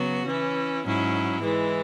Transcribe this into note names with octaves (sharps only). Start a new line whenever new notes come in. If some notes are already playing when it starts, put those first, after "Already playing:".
Already playing: C#3 F#3 B3 F#4
E3 C#4 E4
G#2 F#3 C#4 E4
E3 G#3 E4